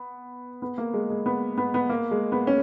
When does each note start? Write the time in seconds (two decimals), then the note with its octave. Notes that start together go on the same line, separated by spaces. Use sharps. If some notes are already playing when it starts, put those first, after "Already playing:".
Already playing: B3
0.62 B3
0.78 A#3
0.94 G#3
1.10 G#3
1.26 B3
1.58 B3
1.74 B3
1.89 A#3
2.11 G#3
2.32 B3
2.47 C#4